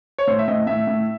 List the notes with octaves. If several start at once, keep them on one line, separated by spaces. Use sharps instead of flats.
C#5
A2 C5
E5
A2 D#5
A2 E5
A2